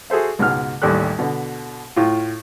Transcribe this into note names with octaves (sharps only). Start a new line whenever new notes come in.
F#4 G#4 A4 C5 E5
C#2 G#2 B2 F6
A1 D#2 G3 G4 A4 F#6
B2 D3
A2 F4